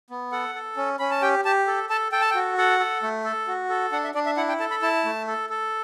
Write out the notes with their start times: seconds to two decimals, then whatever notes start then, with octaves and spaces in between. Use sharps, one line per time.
0.10 B3
0.32 A4 F#5
0.55 A4
0.77 C#4
0.99 C#4 B5
1.11 A5
1.22 G4 G5
1.45 G4 A5
1.67 A4
1.90 A4 A5
2.12 A4 G5
2.21 A5
2.31 G5
2.35 F#4
2.57 A4 F#5
2.80 A4
3.03 A3
3.24 A4
3.48 F#4
3.69 A4
3.92 D4 F#5
4.04 E5
4.15 D4 D5
4.26 E5
4.37 E4 F#5
4.48 G5
4.60 A4 A5
4.70 B5
4.82 E4 A5
5.05 A3
5.27 A4
5.50 A4